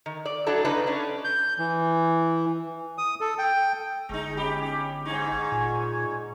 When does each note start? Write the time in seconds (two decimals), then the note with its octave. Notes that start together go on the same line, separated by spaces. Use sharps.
0.06 D#3
0.26 D5
0.47 F#3 D4 E4 A4
0.64 C#3 D4 D#4 B4
0.87 C#4 D4
1.24 G6
1.59 E3
2.98 D#6
3.21 A4
3.39 G5
4.09 G1 G#3 D#4
4.37 C#4 G4 B5
4.63 G4
5.05 G#2 D#4 G#5 C#6 G#6
5.52 A#2